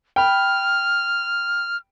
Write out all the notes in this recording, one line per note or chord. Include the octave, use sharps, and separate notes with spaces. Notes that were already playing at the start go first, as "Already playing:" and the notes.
G5 B5 F6